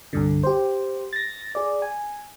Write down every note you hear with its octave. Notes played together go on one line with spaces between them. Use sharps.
C2 G2 D3
G4 C5
A6 A#6
G#4 D5
G#5